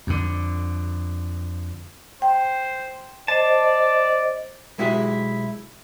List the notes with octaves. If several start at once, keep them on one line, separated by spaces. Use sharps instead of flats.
F2 D3
C5 G5
C5 D5 D#5 A5
B1 G#3 E4 F#4 G4 E5